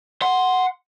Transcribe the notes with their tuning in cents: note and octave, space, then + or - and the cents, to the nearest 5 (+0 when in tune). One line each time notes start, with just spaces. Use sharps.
F#5 +0 C6 +0